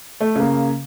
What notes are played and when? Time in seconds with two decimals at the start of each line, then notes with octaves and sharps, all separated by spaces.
0.21 A3
0.36 C#3 A#3